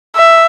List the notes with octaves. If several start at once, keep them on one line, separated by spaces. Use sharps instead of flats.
E5